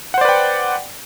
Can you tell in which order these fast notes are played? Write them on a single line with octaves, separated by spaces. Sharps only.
F#5 C5 D5 B4 G5